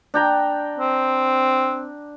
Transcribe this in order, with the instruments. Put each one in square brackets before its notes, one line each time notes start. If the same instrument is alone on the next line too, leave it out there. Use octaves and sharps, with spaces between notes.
[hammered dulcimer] D4 G5 A#5
[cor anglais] C4